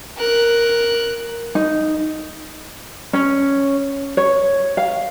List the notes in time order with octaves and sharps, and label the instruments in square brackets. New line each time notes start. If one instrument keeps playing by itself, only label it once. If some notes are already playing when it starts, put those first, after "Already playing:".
[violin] A#4 F#6
[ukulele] D#4
C#4
C#5
F5